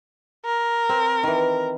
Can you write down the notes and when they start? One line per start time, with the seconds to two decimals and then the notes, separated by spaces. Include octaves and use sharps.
0.45 A#4
0.89 C4
1.23 D#3 E3